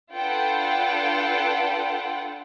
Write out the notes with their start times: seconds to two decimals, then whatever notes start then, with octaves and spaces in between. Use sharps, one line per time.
0.14 D4 F4 A4 B4 F#5 G5